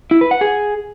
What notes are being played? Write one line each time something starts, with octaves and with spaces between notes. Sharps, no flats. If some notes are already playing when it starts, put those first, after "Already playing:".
E4
B4
F#5
G#4